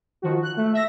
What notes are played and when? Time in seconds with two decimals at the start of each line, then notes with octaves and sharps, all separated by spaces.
0.22 D#3 F3 F#4
0.42 F#6
0.57 A3
0.73 E5 A#6